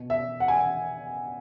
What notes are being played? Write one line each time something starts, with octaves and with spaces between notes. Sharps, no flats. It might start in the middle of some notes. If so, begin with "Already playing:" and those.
Already playing: B2
E5
F#5
G#5
F#5